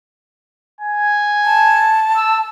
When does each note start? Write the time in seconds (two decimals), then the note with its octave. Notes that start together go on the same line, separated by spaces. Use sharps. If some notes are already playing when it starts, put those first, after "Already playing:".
0.81 G#5
1.45 A5
2.16 E6